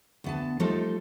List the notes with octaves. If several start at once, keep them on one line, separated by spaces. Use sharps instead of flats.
D2 B3 A5
F3 G3 A3 D#4 F4 A4